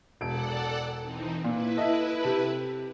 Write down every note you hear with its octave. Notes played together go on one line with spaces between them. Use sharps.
E1 A4 D5 F#5 D7
E3 C4 D#4
A#2 E4 B4
A4 D#5 E5
C3 A4